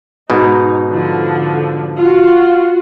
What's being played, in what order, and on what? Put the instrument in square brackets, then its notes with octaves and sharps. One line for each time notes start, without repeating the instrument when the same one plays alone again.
[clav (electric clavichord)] G#2 B2 [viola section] D#4
[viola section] D3 F3
F4 F#4